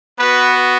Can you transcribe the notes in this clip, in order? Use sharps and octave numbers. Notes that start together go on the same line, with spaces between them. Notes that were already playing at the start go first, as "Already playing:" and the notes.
B3 F#4 B4